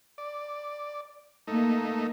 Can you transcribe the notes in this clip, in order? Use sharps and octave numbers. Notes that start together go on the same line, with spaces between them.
D5
A3 A#3 D#4